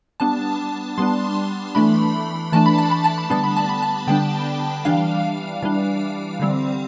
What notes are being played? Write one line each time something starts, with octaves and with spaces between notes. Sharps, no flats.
G3 B3 D4 A5
G3 B3 D4 C6
E3 A3 D4 B5
E3 A3 D4 A5
B5
A5
B5
A5
B5
D3 G3 B3 D4 A5
B5
A5
B5
A5
D3 G3 B3 D4 G5
E3 G3 D4 F5
E3 G3 D4
D3 G3 C4